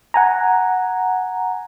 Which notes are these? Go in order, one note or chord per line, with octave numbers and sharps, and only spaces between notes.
F#5 G#5 A#5